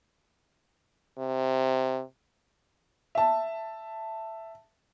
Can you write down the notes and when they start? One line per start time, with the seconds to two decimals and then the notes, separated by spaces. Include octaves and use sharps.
1.18 C3
3.15 E5 A5